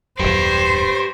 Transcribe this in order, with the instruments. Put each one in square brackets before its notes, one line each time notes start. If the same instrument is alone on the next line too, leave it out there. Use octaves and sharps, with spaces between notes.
[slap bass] D#1 F#2 [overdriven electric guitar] G4 B4 [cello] C5